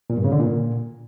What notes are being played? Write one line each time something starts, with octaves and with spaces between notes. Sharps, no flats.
A#2
G2
C#3
D3
A#2